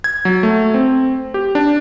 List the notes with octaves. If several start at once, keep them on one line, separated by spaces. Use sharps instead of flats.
G#6
F#3
A3
C4
G4
D4